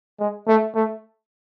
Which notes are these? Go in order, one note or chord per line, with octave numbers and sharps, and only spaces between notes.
G#3
A3
A3